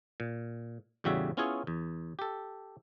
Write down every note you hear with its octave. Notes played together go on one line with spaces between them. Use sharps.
A#2
E2 A2 C#3 G3 F#4 E5
B3 C#4 E4 F4 G#4 C#5
E2
G4 A4